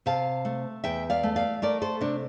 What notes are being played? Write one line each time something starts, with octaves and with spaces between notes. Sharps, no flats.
C3 F5 A5
A3
E2 E5 G5
D5 F5
A3
D5 F5
A3 A#4 D5
A4 C5
C3 D4